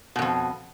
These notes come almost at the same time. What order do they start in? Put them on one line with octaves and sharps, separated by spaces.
B2 G#2 F2